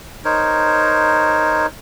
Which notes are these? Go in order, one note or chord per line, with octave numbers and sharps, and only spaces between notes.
D#4 A#4 C5 C#5